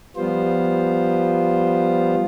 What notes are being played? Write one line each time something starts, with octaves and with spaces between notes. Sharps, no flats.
F3 G3 B3 F4 C5